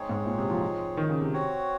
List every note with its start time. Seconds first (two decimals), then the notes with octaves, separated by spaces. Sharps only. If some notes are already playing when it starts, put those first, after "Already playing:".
Already playing: G#3 C4 D#4 G#4 C#5
0.09 G#2
0.26 A#2
0.38 C3
0.50 F3
0.62 F3
0.97 D#3
1.09 C#3
1.21 C3
1.33 C4 F#4 C#5 F#5